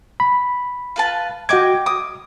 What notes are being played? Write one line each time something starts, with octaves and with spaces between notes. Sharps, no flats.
B5
F4 B4 A5
F#4 D#5 G5 D6 G#6
D6 D#6